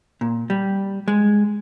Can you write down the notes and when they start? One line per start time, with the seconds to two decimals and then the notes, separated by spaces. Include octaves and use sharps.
0.21 A#2
0.50 G3
1.08 G#3